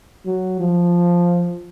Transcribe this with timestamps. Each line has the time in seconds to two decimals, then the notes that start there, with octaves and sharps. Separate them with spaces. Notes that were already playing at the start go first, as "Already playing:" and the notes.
0.25 F#3
0.60 F3